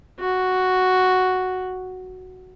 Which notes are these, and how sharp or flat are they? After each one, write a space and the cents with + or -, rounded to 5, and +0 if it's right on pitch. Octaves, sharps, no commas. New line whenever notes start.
F#4 +0